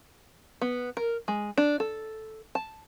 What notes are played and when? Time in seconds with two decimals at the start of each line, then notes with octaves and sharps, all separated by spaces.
0.61 B3
0.97 A#4
1.28 G#3
1.58 D4
1.80 A4
2.55 A5